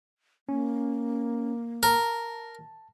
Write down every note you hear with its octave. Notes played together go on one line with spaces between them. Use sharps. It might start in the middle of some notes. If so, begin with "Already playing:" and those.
A#3 C#4
A#4 A5